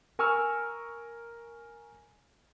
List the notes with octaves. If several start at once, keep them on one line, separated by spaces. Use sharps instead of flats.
A#4 G#5 C#6 E6 F6